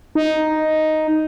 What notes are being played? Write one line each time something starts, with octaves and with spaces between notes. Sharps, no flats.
D#4